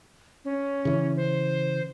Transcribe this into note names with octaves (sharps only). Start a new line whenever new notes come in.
C#4
C#3 E3
C5